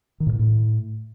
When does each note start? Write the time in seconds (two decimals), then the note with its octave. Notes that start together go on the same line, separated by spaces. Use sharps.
0.20 D#3
0.27 A2
0.33 A#2
0.39 A2